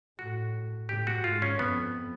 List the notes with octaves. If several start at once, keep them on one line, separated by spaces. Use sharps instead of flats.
A2 F#4
A2 G4
F#4
G#2 F4
C#4
F2 B3